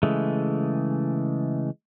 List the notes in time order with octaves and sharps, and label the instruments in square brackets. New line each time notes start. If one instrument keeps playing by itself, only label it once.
[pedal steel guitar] C#3 E3 G#3 A3